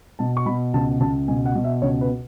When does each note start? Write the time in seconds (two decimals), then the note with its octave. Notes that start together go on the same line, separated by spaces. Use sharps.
0.19 B2 A5
0.37 C#6
0.46 B2 B5
0.74 C#2 A5
1.00 C#2 A5
1.28 B2 G#5
1.46 F#5
1.56 B2
1.64 E5
1.82 C#2 C#5
2.01 B4